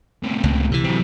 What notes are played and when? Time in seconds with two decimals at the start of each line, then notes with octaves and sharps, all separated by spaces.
0.23 A2 C3
0.44 C#2
0.72 C3 E3
0.85 F#3 C4